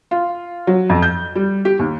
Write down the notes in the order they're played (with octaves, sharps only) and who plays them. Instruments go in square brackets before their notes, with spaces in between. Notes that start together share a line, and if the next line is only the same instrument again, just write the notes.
[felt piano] F4
F#3
F2
G6
G3
G4
D#2